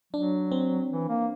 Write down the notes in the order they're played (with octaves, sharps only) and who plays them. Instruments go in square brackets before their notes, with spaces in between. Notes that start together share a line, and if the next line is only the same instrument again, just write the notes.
[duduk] F#3 [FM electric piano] D4
[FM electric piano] C4
[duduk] E3
A#3